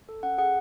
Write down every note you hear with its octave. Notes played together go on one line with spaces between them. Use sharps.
A4
C#4 F#5
G#4 F#5